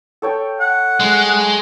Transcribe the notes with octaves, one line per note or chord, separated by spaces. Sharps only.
A4 C#5 G5
F#5
G#3